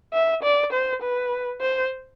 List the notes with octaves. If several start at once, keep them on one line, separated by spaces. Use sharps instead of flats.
E5
D5
C5
B4
C5